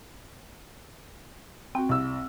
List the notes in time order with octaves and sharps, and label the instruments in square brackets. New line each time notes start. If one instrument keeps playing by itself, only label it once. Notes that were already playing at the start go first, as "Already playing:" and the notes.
[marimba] C4 [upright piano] F#4 G5
[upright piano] C2 E6